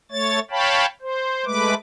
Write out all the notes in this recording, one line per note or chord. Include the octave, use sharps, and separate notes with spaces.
A3 C#5 A6
C#5 F5 G5 A5 B5
C5
G#3 A3 B4 D6